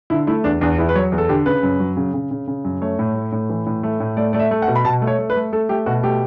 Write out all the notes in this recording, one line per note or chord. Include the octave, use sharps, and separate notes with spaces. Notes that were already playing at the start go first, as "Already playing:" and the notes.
D3 E4
A3 E4
E2 D4
E2 D4
E2 E4
B4
F#3 C#5
E2
A4
D3 G4
C#3 B4
F#2
F#3
C#3
C#3
C#3
C#3
F#2
A3 C#5
A2
A3
A2
E3
A2
A3
A2
A3 D5
A3 D5
E5
A3
F#5
B2
B5
B2 A5
A3
C#5
A3
B4
A3
A3 A4
A3 G4
B2 F#4
A3 G4